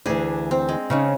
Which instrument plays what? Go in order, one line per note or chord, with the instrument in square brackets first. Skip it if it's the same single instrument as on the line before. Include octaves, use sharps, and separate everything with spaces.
[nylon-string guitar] D2 E3 [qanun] D4 G#4
[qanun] C4
G#3
[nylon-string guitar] C#3 C#4 D#4